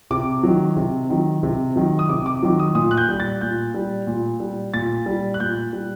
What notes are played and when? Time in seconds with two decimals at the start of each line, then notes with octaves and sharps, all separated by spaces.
0.11 C3 D6
0.43 D#3 F#3
0.76 C3
1.10 D#3 F#3
1.43 C3
1.76 D#3 F#3
1.99 D#6
2.09 C3 D6
2.26 D6
2.43 D#3 F#3
2.59 D#6
2.75 A#2 D#6
2.91 F#6
2.97 G6
3.09 G3
3.20 A6
3.41 A#2 G6
3.74 G3
4.07 A#2
4.40 G3
4.74 A#2 A6
5.06 G3
5.34 F#6
5.40 A#2 G6
5.73 G3